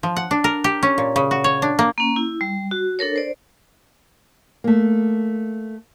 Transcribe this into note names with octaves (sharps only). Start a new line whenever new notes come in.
F3
F#5
D4
A#4
G4
C#4
A#2
C#3
F#4
C#5
D4
A#3
A#3 C#4
E4
G3
F#4
D4 A4 A#4 C#5
C5 D5
A3 A#3